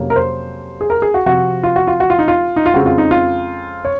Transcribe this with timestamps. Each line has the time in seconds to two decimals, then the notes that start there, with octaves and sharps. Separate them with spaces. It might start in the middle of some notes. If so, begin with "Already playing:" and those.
Already playing: F2 C3 F#3 A#3 C#4
0.10 A#4
0.16 C5
0.81 G#4
0.90 A#4
1.02 G#4
1.14 F#4
1.26 C3 F3 C4 F#4
1.63 F4
1.76 F#4
1.87 F4
2.00 F#4
2.10 F4
2.19 D#4
2.28 F4
2.56 D#4
2.66 F4
2.74 F2 C#3 G#3 C4 F#4
2.86 F4
2.98 D#4
3.11 F4
3.85 C#5